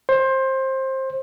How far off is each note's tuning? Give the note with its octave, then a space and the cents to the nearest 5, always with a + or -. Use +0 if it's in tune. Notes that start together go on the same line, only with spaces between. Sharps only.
C5 +20